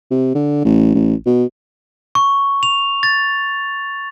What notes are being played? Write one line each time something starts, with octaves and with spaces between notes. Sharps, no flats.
C3
D3
A1
A1
B2
C#6
F7
A6